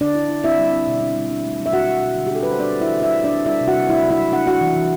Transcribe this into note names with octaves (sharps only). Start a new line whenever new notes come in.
D3 D4 D5
E4
E4
C4 E4 E5
G3
C4
B2
D4
G3
D4
A3
F#3
E5
B2 F#4 F#5
E4
B2
D3
G4
D4 A4
G3 B4
C5
G3 D4 D5
D4
E4 E5
E3
E4 E5
E4
D4 D5
C4
G3 E4 E5
C3
F#4 F#5
G3
A3 E4 E5
F#3
E4 E5
F#3
D4 F#5
D4 F#4 F#5
E3
E3